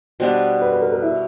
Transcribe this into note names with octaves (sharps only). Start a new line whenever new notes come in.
B2 G3 B3 D4 C5
B4
B4
A#4
A#4
E4